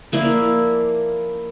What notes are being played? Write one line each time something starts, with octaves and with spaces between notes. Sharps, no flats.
F3 A#3 E4 D5